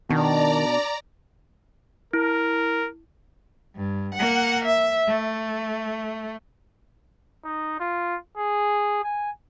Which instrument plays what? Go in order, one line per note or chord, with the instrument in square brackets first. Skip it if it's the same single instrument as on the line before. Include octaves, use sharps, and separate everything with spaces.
[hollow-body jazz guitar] B2 [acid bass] D#3 [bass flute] D4 [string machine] D5 A#5
[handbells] E4 [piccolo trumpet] A#4
[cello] G2
A#3 F#5
E5
A3
[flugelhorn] D#4
F4
G#4
G#5